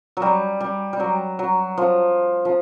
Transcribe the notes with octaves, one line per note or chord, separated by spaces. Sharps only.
F#3
G3
G3
G3
F#3
F#3
F3
F3